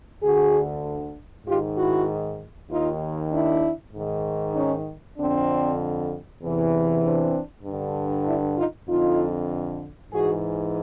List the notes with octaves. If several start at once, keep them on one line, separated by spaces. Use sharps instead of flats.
D2 D3 F#4 G#4
G#2 D#3 F4 G4
E4 F#4
D#2 D#3 D#4 F4
D4 E4
G#2 D#3
C#4 D#4
F2 D3 C4 D4
E2 C3 E3
C4 D4
G2 D3
D4 E4
D#4 F4
F2 D3 D#4 F4
G#2 E3 F#4 G#4